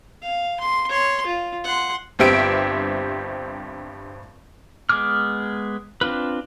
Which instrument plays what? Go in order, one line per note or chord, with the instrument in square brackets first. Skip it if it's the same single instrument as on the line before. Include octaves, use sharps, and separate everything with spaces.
[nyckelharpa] F5
C6
C#5 C6
F4
F#5 C6
[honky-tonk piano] G1 G2 C4 G4 E5 D7
[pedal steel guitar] G#3 B3 G#4 D6 F6
C4 D4 F4 B4